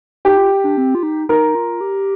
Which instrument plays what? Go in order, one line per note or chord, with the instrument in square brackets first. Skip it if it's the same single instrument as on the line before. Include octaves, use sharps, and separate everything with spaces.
[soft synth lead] D#4 [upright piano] G4
[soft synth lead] F4
D4
C4
F4
D#4
[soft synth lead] D#4 [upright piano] A#4
[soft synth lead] F4
G4